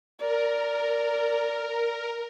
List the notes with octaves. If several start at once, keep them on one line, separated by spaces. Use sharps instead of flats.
A#4 D5